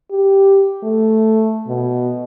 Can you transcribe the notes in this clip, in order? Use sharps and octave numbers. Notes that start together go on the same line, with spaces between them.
G4
A3
B2